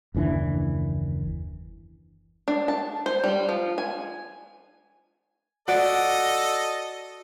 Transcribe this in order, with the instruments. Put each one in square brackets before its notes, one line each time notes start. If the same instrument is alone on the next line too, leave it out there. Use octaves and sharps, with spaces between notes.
[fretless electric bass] F#1 D#2 E3 D4
[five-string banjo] D4
A5
C5
G3
F3
G#5
[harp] F#4 D5 [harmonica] A4 D#5 [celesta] F#5